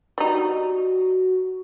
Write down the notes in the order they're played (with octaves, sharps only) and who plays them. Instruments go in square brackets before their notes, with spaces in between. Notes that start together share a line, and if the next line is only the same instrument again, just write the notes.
[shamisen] G3 D#4 [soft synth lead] F#4